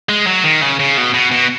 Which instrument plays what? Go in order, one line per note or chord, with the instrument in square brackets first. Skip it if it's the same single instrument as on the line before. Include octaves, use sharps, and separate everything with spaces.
[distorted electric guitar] G#3
F#3
D#3
C#3
C#3
B2
B2
B2